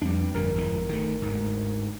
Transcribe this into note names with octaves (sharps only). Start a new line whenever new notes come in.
F2 G3 D4
G1 F2 A#2 G3 A#4
G#1 F2 E3
D#3 A3
D2 G#2